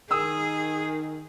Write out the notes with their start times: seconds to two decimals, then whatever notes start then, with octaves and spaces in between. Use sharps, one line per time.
0.11 D#3 G#4 D#6 E6